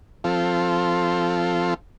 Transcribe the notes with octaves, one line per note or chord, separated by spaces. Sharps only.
F3 C4 F4 A4